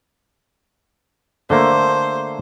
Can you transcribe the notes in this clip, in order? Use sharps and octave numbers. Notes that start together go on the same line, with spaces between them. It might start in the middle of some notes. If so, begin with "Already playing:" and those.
D3 A3 A#3 C5